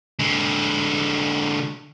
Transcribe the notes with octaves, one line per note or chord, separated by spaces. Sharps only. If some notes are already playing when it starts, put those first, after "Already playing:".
D3 G#3